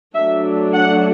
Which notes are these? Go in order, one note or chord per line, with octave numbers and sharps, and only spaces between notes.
F#3 A3 D4 E5
F#5